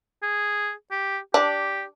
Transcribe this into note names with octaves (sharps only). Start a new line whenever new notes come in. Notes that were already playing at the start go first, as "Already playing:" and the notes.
G#4
G4
D4 G4